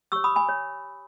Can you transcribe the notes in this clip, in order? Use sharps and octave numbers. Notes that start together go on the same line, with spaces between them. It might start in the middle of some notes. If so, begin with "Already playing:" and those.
G4 C#5 C#6 E6
B5 D#6
G#5 B5
C#5